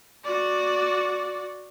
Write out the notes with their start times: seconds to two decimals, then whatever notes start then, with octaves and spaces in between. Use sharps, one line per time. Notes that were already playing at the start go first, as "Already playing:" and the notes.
0.25 F#4 D5